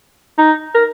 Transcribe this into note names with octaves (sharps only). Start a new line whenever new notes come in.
D#4
A#4